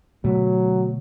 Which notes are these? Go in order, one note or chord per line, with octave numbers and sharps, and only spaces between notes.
B2 D3 F#3 A3